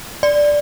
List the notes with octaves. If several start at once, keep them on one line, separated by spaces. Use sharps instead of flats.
D5